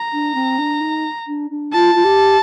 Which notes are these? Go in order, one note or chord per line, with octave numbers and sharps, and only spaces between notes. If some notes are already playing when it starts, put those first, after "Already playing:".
Already playing: A#5
D4
C4
D4
D#4
D4
D4
F4 A5
F4
G4